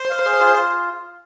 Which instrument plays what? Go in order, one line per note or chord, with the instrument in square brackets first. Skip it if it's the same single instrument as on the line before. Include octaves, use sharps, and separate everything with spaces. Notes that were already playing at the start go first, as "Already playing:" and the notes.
Already playing: [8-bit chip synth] C5
[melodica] F5
G#4
F4
F4